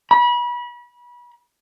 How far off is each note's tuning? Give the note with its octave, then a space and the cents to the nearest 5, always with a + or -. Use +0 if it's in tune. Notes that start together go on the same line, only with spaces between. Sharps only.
B5 -30